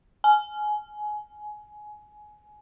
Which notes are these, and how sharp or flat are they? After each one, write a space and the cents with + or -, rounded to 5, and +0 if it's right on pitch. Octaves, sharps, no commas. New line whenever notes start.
G#5 +20